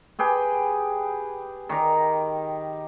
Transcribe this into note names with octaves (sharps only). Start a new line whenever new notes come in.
G4 G#4 B4 G5
D#3 G4 A#5